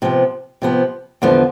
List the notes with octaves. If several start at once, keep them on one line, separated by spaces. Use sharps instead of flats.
C3 F3 B3
C3 F3 B3
E2 D3 F3 B3